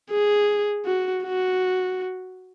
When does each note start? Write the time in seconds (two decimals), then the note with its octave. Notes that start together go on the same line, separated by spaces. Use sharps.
0.11 G#4
0.85 F#4
1.24 F#4